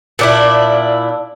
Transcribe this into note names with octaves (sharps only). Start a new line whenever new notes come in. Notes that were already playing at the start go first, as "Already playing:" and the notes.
A#2 D4 E4